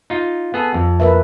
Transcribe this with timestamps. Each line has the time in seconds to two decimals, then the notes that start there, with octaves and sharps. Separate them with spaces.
0.10 D#4 F4
0.54 B3 G#4 A4
0.74 F2
1.00 A#4 B4 E5